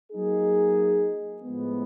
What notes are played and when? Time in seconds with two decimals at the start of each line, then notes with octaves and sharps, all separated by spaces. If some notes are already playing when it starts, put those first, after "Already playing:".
0.11 F#3 A#3 D#4 G#4
1.41 A2 F3 G#3 B3